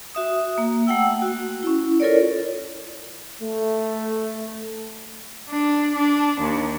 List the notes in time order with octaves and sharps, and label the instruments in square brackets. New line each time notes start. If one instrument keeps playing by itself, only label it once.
[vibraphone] F#4 E5 D#6
A#3
A3 F#5 G5 E6
F#4
C#4 E4
F4 A4 A#4 C#5 D5
[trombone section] A3
[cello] D4
D4
D#2